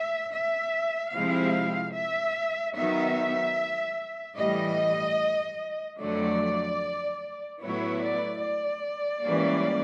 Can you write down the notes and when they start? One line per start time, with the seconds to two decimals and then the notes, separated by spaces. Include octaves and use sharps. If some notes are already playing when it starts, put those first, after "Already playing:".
Already playing: E5
0.34 E5
1.14 C3 F3 G#3 C4 E4 F5
1.95 E5
2.76 D#3 F#3 B3 D#4 E5
4.38 A2 E3 G3 D#5
5.99 F2 D3 F#3 A3 D5
7.61 A2 F#3 B3 E4 C#5
8.02 D5
8.43 D5
9.24 G#2 E3 G3 A#3 C#4